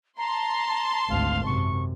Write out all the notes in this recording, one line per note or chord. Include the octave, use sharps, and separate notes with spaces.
A5 A#5 C6
G#1 D2 F5
F#2 C3 C#6